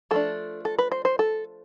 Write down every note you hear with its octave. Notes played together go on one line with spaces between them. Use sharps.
F3 A3 D4 A4
A4
B4
C5
C5
A4